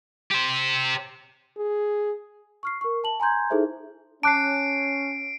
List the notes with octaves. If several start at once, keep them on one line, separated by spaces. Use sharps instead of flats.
G4 C5
G#4
C#6 F6 C7
A#4 C#6
A5 F#7
G#5 A#5 C6 G6 G#6
D#4 E4 G#4 A4 C5 E5
C#4 A5 D6 F#6 C7 D7